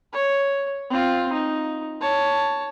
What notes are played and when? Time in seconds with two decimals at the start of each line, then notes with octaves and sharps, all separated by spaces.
0.13 C#5
0.90 C4 F4
1.33 D#4
2.01 C#5 A5